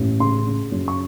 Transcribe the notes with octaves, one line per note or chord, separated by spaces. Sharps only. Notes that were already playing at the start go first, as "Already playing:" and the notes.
Already playing: A1
C#3 C6
C#3
F#2
C#6